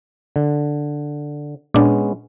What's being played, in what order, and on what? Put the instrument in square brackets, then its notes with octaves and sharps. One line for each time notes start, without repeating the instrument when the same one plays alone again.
[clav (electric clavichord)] D3
[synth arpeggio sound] A#2 D4 [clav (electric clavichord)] G#3 B3 C#4